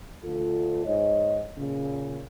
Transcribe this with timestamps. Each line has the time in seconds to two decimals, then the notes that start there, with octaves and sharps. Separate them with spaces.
0.24 D2 F4 A4
0.85 G#2 C#5 D#5
1.58 A#2 C#3